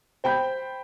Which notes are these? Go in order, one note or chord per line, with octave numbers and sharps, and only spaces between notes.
C5 G5 B5 G6